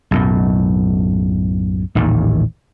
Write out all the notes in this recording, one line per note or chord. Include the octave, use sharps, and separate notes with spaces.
B1 F#2 A2
A1 D#2 A#2 D#3